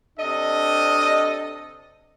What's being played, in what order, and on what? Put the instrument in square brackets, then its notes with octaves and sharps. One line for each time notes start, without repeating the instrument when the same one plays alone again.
[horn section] C3 D4 A4 D#5